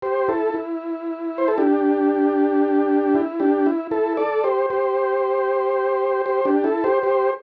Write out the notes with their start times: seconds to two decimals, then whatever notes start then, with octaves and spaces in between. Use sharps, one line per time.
0.02 G4 C5
0.28 E4 A4
0.54 E4
1.38 C5
1.48 A4
1.58 D4 G4
3.15 E4
3.40 D4 G4
3.66 E4
3.91 E4 A4
4.17 A4 D5
4.44 G4 C5
4.70 G4 C5
6.26 G4 C5
6.45 D4 G4
6.64 E4 A4
6.84 G4 C5
7.03 G4 C5